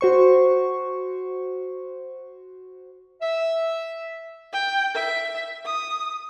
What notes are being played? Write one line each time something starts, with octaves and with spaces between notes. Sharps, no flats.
F#4 C5 C#6
E5
G5
E5
D#6